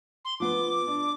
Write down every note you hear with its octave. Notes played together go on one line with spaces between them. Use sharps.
C6
F3 B3 D6
D4